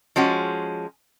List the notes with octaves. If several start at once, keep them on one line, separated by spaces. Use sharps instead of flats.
F3 G#3 C#4 F#4